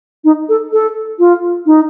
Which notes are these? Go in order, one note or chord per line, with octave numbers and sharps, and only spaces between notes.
D#4
A4
A4
F4
D#4